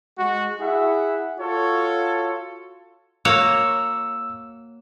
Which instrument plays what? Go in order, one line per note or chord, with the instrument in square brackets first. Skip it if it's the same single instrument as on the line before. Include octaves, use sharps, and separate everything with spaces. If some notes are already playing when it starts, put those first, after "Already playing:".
[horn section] G#3 F#4
E4 G#4 E5 F#5
F4 F#4 A4 C#5
[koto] A#3 F#4 C#5 [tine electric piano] E6